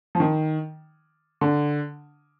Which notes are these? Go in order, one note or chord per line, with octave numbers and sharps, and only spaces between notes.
F3
D#3
D3